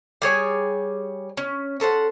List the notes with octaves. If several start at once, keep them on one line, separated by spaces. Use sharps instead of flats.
G3 G#4 C#5 G#5
C#4
C#4 A4 C5 F#5